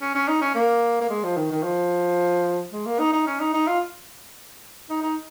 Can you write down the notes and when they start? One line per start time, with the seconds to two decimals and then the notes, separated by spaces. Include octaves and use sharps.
0.01 C#4
0.15 C#4
0.28 D#4
0.41 C#4
0.55 A#3
1.01 A#3
1.10 G#3
1.24 F3
1.37 D#3
1.51 D#3
1.63 F3
2.72 G#3
2.86 A#3
2.99 D#4
3.13 D#4
3.27 C#4
3.40 D#4
3.53 D#4
3.67 F4
4.90 D#4
5.02 D#4